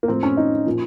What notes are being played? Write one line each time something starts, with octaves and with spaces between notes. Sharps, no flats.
A#3
A2 F3 C4
C#4
D#4
A#2 F3